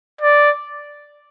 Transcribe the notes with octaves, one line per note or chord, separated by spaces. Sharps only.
D5